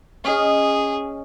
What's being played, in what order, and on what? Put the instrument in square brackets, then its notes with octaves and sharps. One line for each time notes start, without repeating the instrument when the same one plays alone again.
[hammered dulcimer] C#4 D#5 [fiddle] G#4